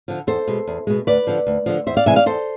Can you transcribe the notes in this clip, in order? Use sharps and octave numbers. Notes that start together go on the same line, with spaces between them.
D3 F3
E2 A4 C5
B2 G#3
E2
B2 G#3
D2 B4 D5
D3 F3
D2
D3 F3
E2 C5 E5
D5 F5
C3 E3 G#3 E5 G#5
D5 F5
E2 A4 C5